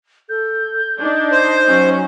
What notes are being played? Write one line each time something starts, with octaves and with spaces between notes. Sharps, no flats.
A4 G6
D4 D#4
C5
F#3 C#4